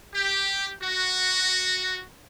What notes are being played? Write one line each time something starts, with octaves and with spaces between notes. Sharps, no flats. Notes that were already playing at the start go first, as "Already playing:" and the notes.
G4
F#4